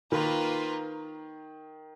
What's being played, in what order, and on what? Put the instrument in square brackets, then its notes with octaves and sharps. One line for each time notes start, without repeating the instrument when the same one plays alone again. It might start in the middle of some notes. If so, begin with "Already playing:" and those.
[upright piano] D#3 [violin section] A#3 F4 B4